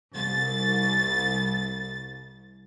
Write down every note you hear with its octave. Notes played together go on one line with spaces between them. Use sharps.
C2 A6